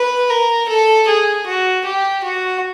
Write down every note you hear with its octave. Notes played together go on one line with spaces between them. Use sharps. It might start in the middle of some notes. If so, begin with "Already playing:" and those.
Already playing: B4
A#4
A4
G#4
F#4
G4
F#4